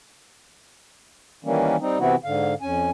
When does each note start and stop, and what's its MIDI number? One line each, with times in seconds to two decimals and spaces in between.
1.45 1.77 51
1.45 1.77 52
1.45 1.77 55
1.45 1.77 58
1.45 1.77 61
1.80 1.99 55
1.80 1.99 60
1.80 1.99 63
1.99 2.15 48
1.99 2.15 52
1.99 2.15 59
1.99 2.15 60
1.99 2.15 64
1.99 2.15 66
2.24 2.54 44
2.24 2.54 50
2.24 2.54 77
2.62 2.91 41
2.62 2.91 61
2.62 2.91 80